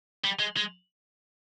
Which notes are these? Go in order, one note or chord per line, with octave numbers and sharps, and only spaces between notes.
G3
G#3
G#3